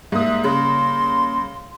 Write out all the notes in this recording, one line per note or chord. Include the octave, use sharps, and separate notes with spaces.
G#2 G3 A#3 E5 D#6
C#3 C6